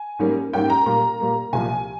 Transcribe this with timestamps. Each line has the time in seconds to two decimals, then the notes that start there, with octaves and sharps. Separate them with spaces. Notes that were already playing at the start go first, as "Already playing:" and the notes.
Already playing: G#5
0.19 G#2 G3 A#3 C#4
0.53 G#2 G3 A#3 C#4 G5
0.70 A#5
0.86 A#2 G3 A#3
1.20 A#2 G3 A#3
1.53 C2 A#2 F3 G#5